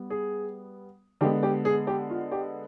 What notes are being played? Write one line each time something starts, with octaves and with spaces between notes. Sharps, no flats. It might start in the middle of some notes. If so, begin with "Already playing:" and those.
Already playing: G3 B3
G#4
D3 G#3 B3 G4
G4
G#4
G4
F4
G4